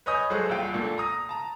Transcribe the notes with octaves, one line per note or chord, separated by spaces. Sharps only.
B4 C#5 D#5 G#5 D#6 G6
G#1 F#3 G#4 A4 C5 F#6
D#1 C2 F4 G5
G#1 A#2 A4
A#5 D#6 A#6
A5 A#5